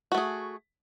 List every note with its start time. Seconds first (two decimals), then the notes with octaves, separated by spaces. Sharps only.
0.12 F#4
0.15 A3
0.18 G#4